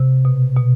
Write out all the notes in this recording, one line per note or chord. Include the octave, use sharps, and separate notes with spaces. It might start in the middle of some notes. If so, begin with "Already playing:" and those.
Already playing: C3
B2
B2